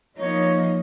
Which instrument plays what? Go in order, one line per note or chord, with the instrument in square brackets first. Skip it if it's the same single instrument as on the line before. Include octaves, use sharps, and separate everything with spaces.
[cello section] F3 A#3 D#4 [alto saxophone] C#5